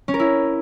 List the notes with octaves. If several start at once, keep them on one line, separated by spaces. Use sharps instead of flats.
C#4
A#4
E4